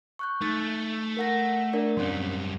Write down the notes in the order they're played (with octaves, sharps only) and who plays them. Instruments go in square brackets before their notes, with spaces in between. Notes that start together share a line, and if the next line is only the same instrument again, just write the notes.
[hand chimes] C#6 F#6 G6
[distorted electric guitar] A3 [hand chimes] D#4 A6
[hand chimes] A#4 F#5 A#6
D4 A#4 D5
[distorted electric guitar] F#2 G3 [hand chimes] C4 C#4 C6